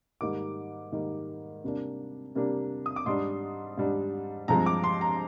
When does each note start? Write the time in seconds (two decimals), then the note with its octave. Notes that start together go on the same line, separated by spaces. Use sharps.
0.21 G#2 D#3 G3 A#3 D6
0.92 G#2 D#3 G3 A#3
1.64 C3 G3 A#3 D4
2.35 C3 G3 A#3 D4
2.86 D#6
2.96 D6
3.06 G#2 G3 D4 C6
3.78 G#2 G3 D4
4.48 G2 F3 G#3 C4 A#5
4.66 D6
4.84 C6
5.01 A#5